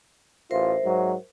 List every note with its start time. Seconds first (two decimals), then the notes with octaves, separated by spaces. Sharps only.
0.51 A1 F4 A#4 C5 E5
0.85 G#2 F#3